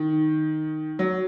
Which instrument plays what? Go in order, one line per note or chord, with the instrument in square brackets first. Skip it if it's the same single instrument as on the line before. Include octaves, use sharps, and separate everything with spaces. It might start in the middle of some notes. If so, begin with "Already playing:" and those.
Already playing: [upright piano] D#3
F#3